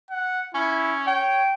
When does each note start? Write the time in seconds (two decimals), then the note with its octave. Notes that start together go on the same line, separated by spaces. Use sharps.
0.11 F#5
0.55 C#4 E4
1.07 C#5 G5